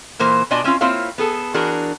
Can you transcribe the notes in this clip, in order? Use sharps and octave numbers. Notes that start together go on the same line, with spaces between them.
A#2 E3 A#3 C5
B2 D4 F4 D5 D#5 G#5
C4 C#4 E4 F4
A#3 C4 E4 F4 C#5 F5
B3 G#4 A4
E3 D4 F#4 G#4 A#4